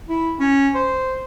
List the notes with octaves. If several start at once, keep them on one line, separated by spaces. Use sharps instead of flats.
E4
C#4
C5